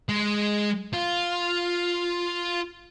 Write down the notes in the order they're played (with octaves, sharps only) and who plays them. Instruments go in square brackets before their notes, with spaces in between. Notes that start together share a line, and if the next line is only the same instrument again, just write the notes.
[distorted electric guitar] G#3
F4